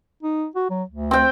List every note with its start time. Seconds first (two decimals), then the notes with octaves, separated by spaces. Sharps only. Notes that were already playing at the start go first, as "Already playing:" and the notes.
0.23 D#4
0.55 F#4
0.70 F#3
0.90 D2
1.11 C4 G5